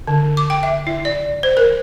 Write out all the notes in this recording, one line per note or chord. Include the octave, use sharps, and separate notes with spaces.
D3
D6
G5
E5
E4
D5
C5
A#4